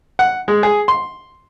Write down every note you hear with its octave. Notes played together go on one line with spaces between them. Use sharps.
F#5
G#3
G#4
C6